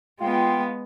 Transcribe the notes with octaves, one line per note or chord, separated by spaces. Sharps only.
G#3 B3 F4 G5 C6